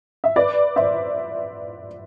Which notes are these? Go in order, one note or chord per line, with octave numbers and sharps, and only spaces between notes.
E5
B4 D5
C5 E5